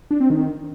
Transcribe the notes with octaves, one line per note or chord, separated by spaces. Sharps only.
D4
C4
D#3